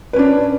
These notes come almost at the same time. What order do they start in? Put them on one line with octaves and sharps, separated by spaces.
B4 C#4 D4